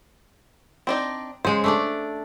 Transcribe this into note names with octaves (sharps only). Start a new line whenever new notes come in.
C4 D4 D#4
C#3 G#3 C5
A3 D4 D5